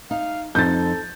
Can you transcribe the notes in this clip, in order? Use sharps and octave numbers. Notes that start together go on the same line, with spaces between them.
D#4 F5
F2 D#4 A4 C5 G6 A6